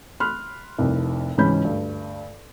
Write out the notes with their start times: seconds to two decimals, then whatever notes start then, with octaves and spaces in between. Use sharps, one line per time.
0.20 B5 C6 F6 F#6
0.79 F1 C2
1.38 C#2 G#2 E3 C#4 B5 G6
1.64 D2 G2